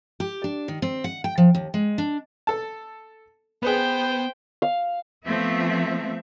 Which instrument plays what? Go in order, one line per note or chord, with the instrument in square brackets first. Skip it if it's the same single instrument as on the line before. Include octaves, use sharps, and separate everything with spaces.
[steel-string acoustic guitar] G4
D4
D#3
C4
F#5
G5
F3
D#2
G#3
D4
[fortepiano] A4 A5
[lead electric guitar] B3 [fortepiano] G#4 B4 [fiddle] C5 G5
[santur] F5
[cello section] F3 A3 B3 C4 E5